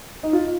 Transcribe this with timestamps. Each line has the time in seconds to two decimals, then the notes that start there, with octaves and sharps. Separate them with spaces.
0.23 D#4
0.33 F4